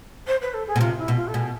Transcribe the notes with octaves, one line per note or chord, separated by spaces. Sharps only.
C5
B4
A4
G#4
B2
C3 F4
E4
B2
F4
A4
B2 G#4